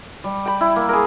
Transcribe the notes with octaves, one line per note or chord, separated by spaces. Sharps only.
G3
G5 B5
E4
A#3
G#4 A#4